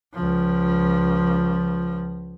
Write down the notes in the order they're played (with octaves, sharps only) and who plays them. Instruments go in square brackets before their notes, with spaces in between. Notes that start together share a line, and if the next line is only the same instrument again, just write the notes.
[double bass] C#2 F3